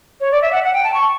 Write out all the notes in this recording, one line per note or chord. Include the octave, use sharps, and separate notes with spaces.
C#5
D5
E5
F#5
F#5
G5
A5
C#6